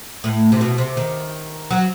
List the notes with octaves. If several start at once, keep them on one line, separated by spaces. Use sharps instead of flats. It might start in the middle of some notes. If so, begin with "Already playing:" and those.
A2
C3
B2
C3
D#3
F#3